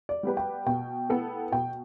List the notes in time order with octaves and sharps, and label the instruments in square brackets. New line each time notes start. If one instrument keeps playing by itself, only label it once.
[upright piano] D5
[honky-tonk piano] G3 B3 G4 B4
[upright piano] G5
[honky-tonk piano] B2 [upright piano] G5
[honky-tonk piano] B3 E4 A4
[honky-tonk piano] B2 [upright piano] G5